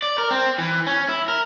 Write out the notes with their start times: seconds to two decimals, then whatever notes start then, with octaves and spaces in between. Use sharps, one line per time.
0.02 D5
0.18 A#4
0.31 C4
0.58 E3
0.87 C#4
1.09 E4
1.28 A#4